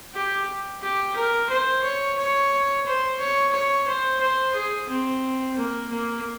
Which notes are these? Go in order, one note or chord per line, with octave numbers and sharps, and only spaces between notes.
G4
G4
A#4
C5
C#5
C#5
C5
C#5
C#5
C5
C5
G#4
C4
A#3
A#3